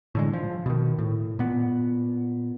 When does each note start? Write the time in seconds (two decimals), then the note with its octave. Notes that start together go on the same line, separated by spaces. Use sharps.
0.15 A2 D3 G#3
0.33 F3
0.66 B2 D#3
0.99 A2
1.39 A#2 B3